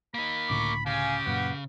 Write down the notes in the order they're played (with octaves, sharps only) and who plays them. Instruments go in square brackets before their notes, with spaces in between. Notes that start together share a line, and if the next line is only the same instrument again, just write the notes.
[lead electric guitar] A#3 D#4 [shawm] B5
[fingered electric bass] C#2 A2 D3 [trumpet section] A#5 C#6 D6
[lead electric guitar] C#3 [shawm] G4 [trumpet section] F5 G#5
[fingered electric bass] F#2 A#2 [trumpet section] B4 F5 F#5